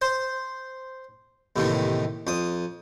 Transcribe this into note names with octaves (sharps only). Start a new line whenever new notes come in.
C5
D#2 A2 C3 D#3 E3
F2 D#6